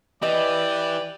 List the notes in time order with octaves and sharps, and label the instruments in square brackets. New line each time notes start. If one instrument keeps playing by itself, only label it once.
[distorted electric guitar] E3 [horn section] G4 B4 D5 [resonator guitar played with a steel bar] D#5